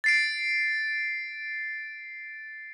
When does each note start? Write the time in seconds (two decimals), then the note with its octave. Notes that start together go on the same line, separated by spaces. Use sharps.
0.04 A6 C7 D7